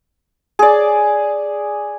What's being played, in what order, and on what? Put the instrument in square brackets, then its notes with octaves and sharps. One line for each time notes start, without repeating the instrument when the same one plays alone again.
[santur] G#4 D5